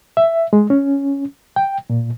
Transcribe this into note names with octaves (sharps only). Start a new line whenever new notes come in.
E5
G#3
C#4
G5
A#2